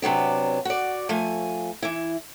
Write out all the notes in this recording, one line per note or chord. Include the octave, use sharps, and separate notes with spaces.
C3 F#3 B3 D4
F#4 D5
F3 A3 G#5
E3 E4